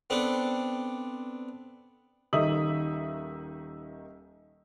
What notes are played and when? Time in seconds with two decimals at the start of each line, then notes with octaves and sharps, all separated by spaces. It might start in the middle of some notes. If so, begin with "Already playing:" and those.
0.10 B3 C4 D4 A4
2.33 D#1 D#3 D#4 E5 D#6 F#7